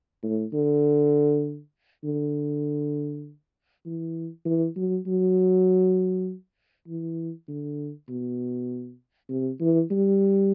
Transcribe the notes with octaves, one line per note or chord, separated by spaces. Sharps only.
A2
D3
D3
E3
E3
F#3
F#3
E3
D3
B2
C3
E3
G3